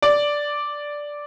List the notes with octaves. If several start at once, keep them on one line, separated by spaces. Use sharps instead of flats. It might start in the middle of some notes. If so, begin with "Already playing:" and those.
D5